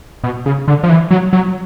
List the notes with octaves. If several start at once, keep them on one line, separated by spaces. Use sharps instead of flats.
B2
C#3
D3
F3
E3
F#3
F#3